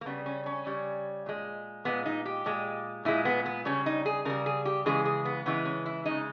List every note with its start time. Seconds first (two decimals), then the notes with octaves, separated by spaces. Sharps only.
0.01 A#3
0.06 C#3 G3 B3
0.26 C#4
0.46 C#4
0.66 C#3 G3
1.26 A#2 G#3
1.85 A#2 G#3 B3
2.06 D#4
2.26 G4
2.46 A#2 G#3
3.05 A#2 G#3 E4
3.25 B3
3.46 B3
3.65 C#3 G3 C#4
3.86 D#4
4.06 G#4
4.25 C#3 G3 A#4
4.46 G#4
4.65 G4
4.86 C#3 E3 G#3 G#4
5.06 G#4
5.25 B3
5.46 C#3 E3 G#3 B3
5.65 C#4
5.86 E4
6.06 C#3 G#3 D#4